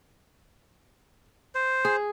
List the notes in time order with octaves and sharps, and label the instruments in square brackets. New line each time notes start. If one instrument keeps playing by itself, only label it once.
[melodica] C5
[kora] G#4